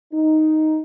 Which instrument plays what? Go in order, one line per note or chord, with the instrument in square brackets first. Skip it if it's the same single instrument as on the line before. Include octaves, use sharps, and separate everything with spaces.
[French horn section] D#4